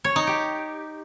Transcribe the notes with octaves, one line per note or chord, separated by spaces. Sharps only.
C#5
D#4
G4